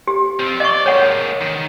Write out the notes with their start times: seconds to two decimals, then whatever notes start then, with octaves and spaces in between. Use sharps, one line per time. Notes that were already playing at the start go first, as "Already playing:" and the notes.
0.07 G4
0.39 C4 F4
0.60 D5 D#5 C#6
0.86 G#3 A#3 C#5 F#5
1.41 D#3